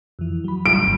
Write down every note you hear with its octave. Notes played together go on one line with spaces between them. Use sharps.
F2 E3
F#3 B5
G3 C#4 D7
G1 D#2